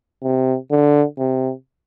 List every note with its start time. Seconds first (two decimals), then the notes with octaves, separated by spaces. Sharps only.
0.23 C3
0.71 D3
1.19 C3